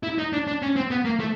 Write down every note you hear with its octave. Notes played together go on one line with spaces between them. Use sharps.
E4
D#4
D4
D4
C#4
C4
B3
A#3
A3